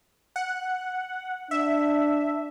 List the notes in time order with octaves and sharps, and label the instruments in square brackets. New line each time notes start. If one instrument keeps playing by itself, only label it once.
[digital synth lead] F#5
[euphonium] D4 [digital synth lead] E5